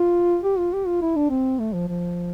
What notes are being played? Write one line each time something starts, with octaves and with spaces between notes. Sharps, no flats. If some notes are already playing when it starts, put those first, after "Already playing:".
Already playing: F4
G4
F4
G4
F4
E4
D4
C4
A3
F3
F3